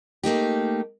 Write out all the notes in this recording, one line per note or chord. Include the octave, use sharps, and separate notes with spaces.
A3 A#3 D#4 G4